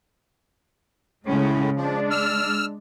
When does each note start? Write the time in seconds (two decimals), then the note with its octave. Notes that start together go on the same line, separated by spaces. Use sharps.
1.26 A2 C#3 G#3 C#4
1.76 F3 G#3 D4
2.11 E6 F6